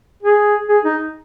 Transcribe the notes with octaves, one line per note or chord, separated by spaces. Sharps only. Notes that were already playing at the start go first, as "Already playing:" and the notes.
G#4
G#4
D#4